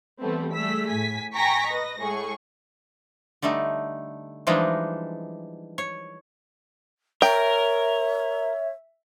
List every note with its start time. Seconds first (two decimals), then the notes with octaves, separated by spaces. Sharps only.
0.20 E3 G3 A3 B3 C4
0.53 G3 A3 G#4 E6 B6
0.89 A2 G#5 B6
1.34 G5 G#5 A#5 C#6 A#6 B6
1.68 B4 D#5 A#6
2.00 A2 G#3 G#4 C#6
3.42 D3 G3 A3 D#4
4.47 E3 F3 G3 G#3 D4 D#4
5.78 C#5
7.22 A#4 C#5 E5 G5